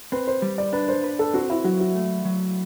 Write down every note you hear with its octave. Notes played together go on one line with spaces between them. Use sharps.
C4 B4
C5
G3
D5
D4 B4
C5
B4
A4
C4 F#4
E4
F#3 F#4
F#4
A3
F#3